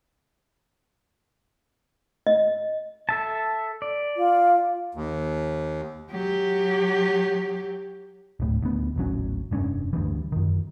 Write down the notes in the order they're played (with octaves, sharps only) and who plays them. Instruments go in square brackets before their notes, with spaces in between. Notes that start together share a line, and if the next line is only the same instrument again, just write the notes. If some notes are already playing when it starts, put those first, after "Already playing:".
[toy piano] D#5
[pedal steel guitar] A4 E5 A5
D5
[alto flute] F4
[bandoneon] D#2
[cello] F#3 G4
[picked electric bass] D1 A2
D2 B3
D#1 A1 F#3 C#4
F1 G2 C4 C#4
D2 G2 E3
F#2 D#3